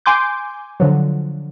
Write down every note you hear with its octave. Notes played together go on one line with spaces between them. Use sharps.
G#5 C6 D6 G6
D3 F3 F#3